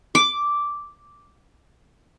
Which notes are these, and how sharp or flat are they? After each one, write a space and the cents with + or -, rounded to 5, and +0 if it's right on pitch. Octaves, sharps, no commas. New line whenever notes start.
D6 -5